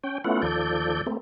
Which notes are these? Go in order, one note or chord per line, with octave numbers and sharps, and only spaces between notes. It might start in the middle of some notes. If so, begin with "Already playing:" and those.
C#4 G5
A3 B3 C#4 E4 F4 F#5
D#2 F3 A4 D5 G6
A3 A#3 C4